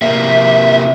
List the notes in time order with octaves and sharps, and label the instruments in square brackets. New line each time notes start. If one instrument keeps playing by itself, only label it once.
[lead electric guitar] C3 A#3 [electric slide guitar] E5